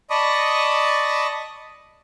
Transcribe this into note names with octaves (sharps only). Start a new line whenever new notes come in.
D5 D#5 A5 B5 C#6 D#6